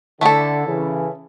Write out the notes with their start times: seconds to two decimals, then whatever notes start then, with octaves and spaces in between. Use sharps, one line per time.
0.21 D3 A3 E4 A4
0.67 C#3 E3